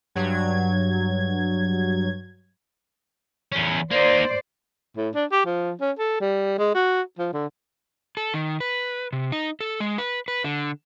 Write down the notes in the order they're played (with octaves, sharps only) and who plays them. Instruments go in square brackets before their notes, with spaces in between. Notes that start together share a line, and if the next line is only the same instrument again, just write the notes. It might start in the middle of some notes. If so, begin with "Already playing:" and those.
[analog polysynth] G2 F#3 G#6
[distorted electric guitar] E2 C#4
[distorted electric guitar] A#3 D#4 [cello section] C5 D5
[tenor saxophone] A2
D4
G4
F3
C#4
A4
G3
G#3
F#4
F3
D3
[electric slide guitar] A4
D#3
B4
C3
D#4
A4
G#3
B4
B4
D3